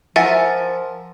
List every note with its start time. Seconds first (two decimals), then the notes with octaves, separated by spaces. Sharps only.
0.16 F3 A#4 E5 F#5 G#5 A6